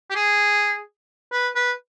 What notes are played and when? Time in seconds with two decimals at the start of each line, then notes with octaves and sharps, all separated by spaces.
0.10 G4
0.16 G#4
1.32 B4
1.56 B4